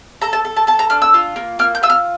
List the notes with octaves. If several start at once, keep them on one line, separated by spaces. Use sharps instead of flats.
A4 A#5
A5
A4
A5
A4 A5
A#5
D4 F6
E6
F4
A#3
A#3 F6
G6
F4 E6
F6